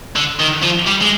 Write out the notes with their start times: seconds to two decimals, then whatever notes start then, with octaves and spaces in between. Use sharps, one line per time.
0.16 D3
0.39 D#3
0.62 F3
0.87 G3
1.01 G#3